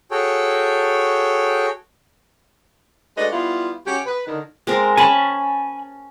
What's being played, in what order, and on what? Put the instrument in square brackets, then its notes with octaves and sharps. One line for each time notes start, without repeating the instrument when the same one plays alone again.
[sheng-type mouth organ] F#4 G#4 A4 C#5 G5
[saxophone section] G#3 A3 D4 F#4 B4 D#5
G3 B3 E4 F4
C#3 C#4 F#4 G4
B4
D3 D#3
[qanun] G#3 C4 A#4
[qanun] C#4 A5 [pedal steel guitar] G#5 B5